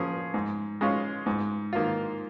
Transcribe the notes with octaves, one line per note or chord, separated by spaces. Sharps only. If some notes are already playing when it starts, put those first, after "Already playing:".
Already playing: F3 A#3 C#4 G#4
G#2
G#3 C#4 F4 C#5
G#2
D#3 A#3 F4